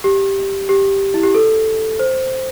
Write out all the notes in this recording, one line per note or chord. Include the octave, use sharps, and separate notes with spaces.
G4
G4
E4
G4
A4
C5